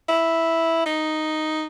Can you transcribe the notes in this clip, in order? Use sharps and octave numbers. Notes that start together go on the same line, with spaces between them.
E4
D#4